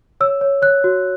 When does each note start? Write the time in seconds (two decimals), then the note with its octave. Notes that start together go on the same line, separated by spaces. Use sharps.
0.21 C#5 E6
0.41 C#5
0.62 C#5 F#6
0.84 F#4